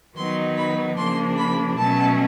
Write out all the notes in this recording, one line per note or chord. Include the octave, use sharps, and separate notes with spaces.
D#3 F#3 B3 D#4 C6
B5
C#3 F3 A#3 D4 C6
B5
B2 F#3 A3 C#4 A5